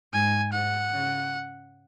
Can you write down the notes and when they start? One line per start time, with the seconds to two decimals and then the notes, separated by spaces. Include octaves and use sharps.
0.13 G#2 G#5
0.53 G#2 F#5
0.94 C#3